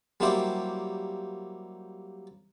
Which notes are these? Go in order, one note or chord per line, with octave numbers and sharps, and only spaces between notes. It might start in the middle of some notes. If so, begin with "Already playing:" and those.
F#3 G3 A#3 E4 G4 C5